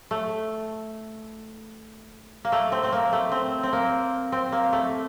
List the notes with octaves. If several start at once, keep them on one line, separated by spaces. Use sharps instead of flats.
A3
A#3
A3
C4
C4
A#3
A3
C4
C4
A#3
C4
A#3
A3